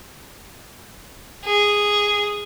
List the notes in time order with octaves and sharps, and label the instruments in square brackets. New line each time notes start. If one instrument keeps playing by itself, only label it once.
[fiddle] G#4